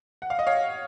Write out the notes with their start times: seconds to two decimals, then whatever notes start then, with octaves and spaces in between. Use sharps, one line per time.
0.22 F#5
0.30 F5
0.39 D#5
0.47 C#5 F5